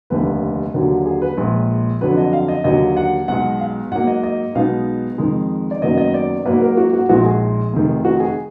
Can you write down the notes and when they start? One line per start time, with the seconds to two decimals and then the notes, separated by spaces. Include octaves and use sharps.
0.10 F1 D#2 D3 B4
0.74 D#2 D3 F#3
1.06 G#4
1.22 B4
1.38 A#1 A#2 G#3
2.01 F2 D3 F#3 B4
2.17 D#5
2.33 F5
2.48 D#5
2.64 D#2 D3 F#3 D#5
2.97 F#5
3.28 B1 B2 G#3 F#5
3.60 F5
3.91 G#2 F#3 A#3 F#5
4.07 D#5
4.23 D#5
4.55 B1 B2 G#3 B3 D#4 F5
5.18 F2 D#3 G#3
5.71 D5
5.82 F#1 F#2 D#3 F#3 B3 D#5
5.98 D#5
6.14 D5
6.45 G#2 F#3 A#3 B4
6.62 A#4
6.77 F#4
6.93 F#4
7.09 A#1 A#2 G#3 D#4 F#4
7.25 G#4
7.73 F1 F2 D#3
8.05 F#4
8.20 G#4